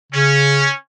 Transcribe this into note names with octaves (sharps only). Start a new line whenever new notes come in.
C#3 C#4